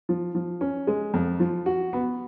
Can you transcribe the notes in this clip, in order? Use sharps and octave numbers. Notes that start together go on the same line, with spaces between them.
F3
F3
C#4
G#3
F2
F3
F#4
B3